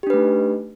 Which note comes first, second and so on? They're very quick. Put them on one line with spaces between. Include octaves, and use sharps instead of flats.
G4 D4 B4 A3 D#4